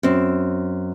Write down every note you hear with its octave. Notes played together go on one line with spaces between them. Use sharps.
F#2 C4